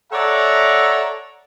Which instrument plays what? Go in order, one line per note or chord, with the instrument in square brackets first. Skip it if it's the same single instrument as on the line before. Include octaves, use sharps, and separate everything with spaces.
[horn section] A4 C#5 D5 E5 F#5 A#5